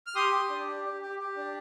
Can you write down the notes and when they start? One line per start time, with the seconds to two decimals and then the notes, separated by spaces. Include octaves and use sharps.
0.06 F6
0.15 G4 C6 D#6
0.32 G4
0.49 D4
0.68 G4
0.84 G4
1.02 G4
1.19 G4
1.36 D4